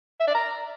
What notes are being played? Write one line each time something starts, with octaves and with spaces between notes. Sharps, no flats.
E5
D5
A#5